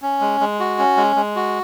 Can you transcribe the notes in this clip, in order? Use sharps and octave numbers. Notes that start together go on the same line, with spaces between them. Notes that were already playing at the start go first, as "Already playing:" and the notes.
C#4
G#3
G#3
F#4
C#4
G#3
G#3
F#4